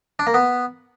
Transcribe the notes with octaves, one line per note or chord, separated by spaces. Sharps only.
D4
A#3
B3